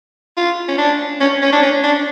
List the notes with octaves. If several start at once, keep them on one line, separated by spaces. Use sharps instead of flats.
F4
C#4
D4
C#4
C#4
D4
C#4
D4